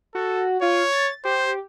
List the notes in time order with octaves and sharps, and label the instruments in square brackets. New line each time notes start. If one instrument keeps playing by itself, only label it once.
[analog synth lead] F#4 [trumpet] A4
[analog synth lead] F4 [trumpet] C#5
[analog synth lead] A6
[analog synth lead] G4 [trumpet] C5